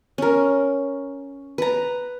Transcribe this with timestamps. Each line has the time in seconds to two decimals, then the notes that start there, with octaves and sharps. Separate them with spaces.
0.18 C#4 A#4
1.58 B4 A#5